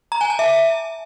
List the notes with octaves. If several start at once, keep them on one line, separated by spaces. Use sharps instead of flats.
A#5
G#5
A5
E5